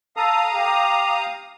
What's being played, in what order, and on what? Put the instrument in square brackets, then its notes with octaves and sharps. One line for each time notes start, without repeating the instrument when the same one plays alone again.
[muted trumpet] A4 [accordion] F5 A#5 D#6
[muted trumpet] G4